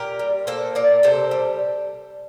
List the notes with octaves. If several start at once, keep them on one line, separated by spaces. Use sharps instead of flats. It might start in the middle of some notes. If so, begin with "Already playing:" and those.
Already playing: A#2 G4 A#4
G3
A#3 A4 C5
A#2 A#4 D5
C3 A4 C5
G3